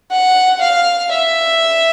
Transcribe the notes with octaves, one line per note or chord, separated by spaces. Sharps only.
F#5
F5
E5